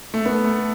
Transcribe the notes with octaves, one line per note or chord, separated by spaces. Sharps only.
A3
B3
A3